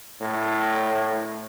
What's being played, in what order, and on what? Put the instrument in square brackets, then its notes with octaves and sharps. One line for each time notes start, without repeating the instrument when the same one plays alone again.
[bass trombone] A2